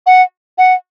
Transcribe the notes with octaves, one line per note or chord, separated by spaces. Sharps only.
F#5
F#5